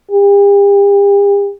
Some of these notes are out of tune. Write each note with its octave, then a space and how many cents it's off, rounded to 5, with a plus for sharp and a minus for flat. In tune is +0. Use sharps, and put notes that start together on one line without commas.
G4 +40